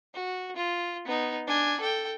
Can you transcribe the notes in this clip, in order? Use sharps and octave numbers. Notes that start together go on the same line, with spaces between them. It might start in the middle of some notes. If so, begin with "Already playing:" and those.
F#4
F4
B3 D#4
D4 G#5
A4 G5